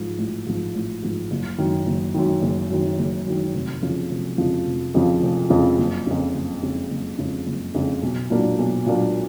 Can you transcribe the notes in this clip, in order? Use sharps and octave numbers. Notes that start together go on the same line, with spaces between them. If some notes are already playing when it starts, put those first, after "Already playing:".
Already playing: G#2 F3
A1
G#2 F3
A1
G#2 F3
F#1
F#2 D#3
F#1
F#2 D#3
F#1
F#2 D#3
F#1
F#2 D#3
F1
F2 C#3 F3
F1
F2 C#3 F3
F1
F2 C#3 F3
F1
F2 C#3 F3
F#1
F2 C#3
F#1
F2 C#3
F#1
F2 C#3
F#1
F2 C#3
B1
A#2 F#3 A#3 D4
B1
A#2 F#3 A#3 D4